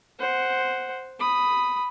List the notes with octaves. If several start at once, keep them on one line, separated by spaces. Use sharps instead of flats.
C5 F#5
B5 D#6